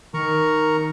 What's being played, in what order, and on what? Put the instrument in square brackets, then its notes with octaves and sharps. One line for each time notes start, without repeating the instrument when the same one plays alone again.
[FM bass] D#3 [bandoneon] A#4 A#5 C#6